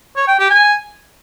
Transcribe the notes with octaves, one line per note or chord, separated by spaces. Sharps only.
C#5
G5
G4
G#5